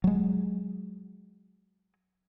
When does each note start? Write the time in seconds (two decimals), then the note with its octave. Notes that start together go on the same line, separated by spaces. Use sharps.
0.04 F#3 G#3